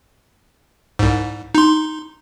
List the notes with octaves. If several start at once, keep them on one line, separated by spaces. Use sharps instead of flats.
C2 G#2
D#4 C6